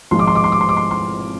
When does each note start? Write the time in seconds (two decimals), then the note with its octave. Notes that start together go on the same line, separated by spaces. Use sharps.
0.11 G#1 G#2 F3 G#3 C6
0.19 D6
0.27 C6
0.35 D6
0.44 C6
0.52 D6
0.61 C6
0.69 D6
0.77 C6
0.91 C6